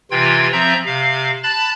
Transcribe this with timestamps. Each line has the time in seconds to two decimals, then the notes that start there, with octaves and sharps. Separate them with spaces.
0.11 C3 E3 F4 G5 G#6
0.53 F3 C4 E5 A#5 G6
0.86 C3 F5
1.43 A5 B5 F#6 A6